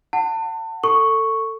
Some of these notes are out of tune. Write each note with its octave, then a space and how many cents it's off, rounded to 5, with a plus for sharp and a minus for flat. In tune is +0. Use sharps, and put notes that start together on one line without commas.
F#5 +0 A5 +30
A4 +25 C#6 +0